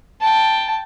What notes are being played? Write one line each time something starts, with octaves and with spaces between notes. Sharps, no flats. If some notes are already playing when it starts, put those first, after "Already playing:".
G5 A5